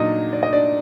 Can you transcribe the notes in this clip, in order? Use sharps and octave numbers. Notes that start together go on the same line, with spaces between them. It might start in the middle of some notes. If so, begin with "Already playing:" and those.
Already playing: A#2 F#3 D4 D#4 D#5
D5
D#5
D4 D5